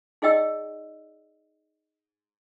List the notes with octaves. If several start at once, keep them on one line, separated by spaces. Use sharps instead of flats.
D#4 G#4 D5 D#5 G5 E6